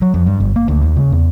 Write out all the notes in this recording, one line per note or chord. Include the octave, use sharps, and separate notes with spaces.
F#3
F2
G2
G1
A#3
D2
D#2
C#3
E2